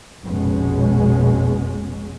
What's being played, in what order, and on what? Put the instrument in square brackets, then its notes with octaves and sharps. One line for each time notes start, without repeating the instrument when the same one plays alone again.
[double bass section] F1 A#1 B2 G#3 C#4